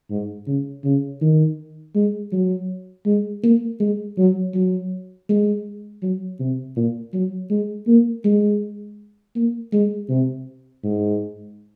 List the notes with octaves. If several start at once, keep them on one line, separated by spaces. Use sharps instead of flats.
G#2
C#3
C#3
D#3
G#3
F#3
G#3
A#3
G#3
F#3
F#3
G#3
F#3
C3
A#2
F#3
G#3
A#3
G#3
A#3
G#3
C3
G#2